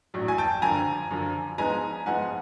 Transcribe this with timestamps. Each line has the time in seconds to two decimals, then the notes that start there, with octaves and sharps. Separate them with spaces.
0.14 A#1 A2 F#3
0.28 G#5
0.38 G5 A5
0.62 F#2 D3 F3 G#5 A#5
1.11 F#2 D3 F3
1.58 G#2 F3 G#3 B3 D#4 G#5 A#5
2.06 G#2 F3 G#3 B3 D#4 F#5 G#5